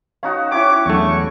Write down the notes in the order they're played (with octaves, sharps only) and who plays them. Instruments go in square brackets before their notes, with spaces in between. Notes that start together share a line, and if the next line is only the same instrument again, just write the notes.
[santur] C#4 D#4 F#4 [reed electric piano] F5
[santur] C#4 E4 C#5 [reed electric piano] G5 [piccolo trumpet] D6
[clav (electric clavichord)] E2 A3 [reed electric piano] E3 F#3 D4 [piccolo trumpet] C#6